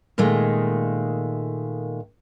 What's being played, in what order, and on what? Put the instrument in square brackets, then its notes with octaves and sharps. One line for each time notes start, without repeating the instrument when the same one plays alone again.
[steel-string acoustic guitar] A#2 D#3 G#3 A3